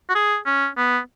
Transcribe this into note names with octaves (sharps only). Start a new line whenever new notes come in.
F#4
G#4
C#4
B3